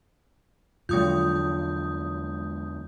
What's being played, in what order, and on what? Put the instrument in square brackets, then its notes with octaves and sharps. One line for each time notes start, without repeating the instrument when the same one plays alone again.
[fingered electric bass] E2 D3 [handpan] F3 F#3 F4 [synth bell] G#3 D#6 G6